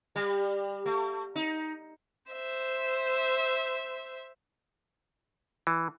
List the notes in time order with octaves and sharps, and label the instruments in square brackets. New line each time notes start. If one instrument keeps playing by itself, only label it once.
[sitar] G3
A3
D#4
[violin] C5 E5
[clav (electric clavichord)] E3